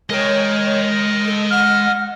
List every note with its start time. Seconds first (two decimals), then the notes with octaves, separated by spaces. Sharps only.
0.10 G#3 A#4 C#5 D#5 G5
1.25 A4
1.50 F#5 F6